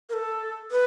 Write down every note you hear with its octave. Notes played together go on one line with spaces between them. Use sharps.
A#4
A4
B4